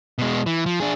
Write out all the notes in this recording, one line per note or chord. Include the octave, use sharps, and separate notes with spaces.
B2 G#3
E3
F3
D4 G#4